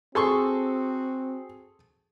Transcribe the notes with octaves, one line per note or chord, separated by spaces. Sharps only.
C4 F#4 G#4 A4 C6 C#6